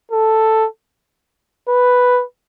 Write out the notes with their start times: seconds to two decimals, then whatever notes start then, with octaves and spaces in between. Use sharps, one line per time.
0.12 A4
1.69 B4